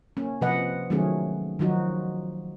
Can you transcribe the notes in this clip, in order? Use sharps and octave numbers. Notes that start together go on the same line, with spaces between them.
A#3 C#4
C3 F3 B4 D#5 F#5
D#3 F#3 A3 C#4 G#4
D#3 F3 F#3 D#4 F#4